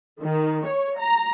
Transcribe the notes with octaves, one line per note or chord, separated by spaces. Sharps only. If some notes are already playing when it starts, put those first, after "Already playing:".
D#3
C#5
A#5